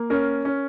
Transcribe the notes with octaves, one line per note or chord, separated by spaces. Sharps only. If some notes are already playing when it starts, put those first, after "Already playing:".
Already playing: A#3
C#4 A#4
C#4